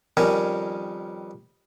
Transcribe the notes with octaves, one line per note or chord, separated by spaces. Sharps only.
F2 D#3 G3 C#4 A#4 G#5